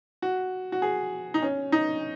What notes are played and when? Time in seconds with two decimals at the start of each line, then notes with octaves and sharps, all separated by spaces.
0.22 F#4
0.72 F#4
0.82 G#4
1.34 D#4
1.42 C#4
1.72 D#4